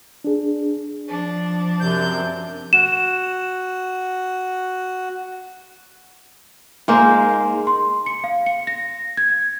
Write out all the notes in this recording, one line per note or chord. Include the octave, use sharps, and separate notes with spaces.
D4 G#4
F3 D4
F#2 C3 G6
F#4 E7
G#2 G#3 A#3 C5
C6
C#7
F5
C#7
A#6
G#6